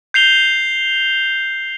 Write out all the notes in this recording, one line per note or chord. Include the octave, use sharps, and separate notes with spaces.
G6 C7 F7 G7